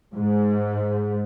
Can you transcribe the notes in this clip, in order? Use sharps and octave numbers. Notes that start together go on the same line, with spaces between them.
G#2